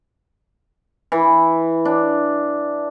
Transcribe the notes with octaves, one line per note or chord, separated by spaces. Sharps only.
E3
D4